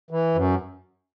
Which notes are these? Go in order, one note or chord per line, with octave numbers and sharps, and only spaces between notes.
E3
F#2